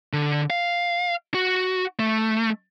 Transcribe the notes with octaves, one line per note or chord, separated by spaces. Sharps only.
D3
F5
F#4
A3